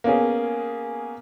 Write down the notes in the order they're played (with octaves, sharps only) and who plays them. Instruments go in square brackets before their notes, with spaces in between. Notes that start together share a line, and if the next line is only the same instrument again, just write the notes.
[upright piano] A#3 B3 C#4 G#4